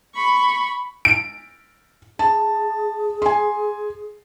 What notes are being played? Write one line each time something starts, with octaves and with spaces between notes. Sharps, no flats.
B5 C#6
D7
G#4 A5
G#5 C6